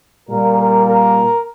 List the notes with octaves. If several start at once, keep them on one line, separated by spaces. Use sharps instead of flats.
A#2 G3 A#3 A#4
A#4
A#4